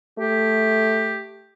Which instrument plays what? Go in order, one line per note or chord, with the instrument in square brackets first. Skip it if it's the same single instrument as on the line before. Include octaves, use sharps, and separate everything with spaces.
[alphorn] A3 [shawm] G4